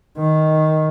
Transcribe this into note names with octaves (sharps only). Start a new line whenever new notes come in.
D#3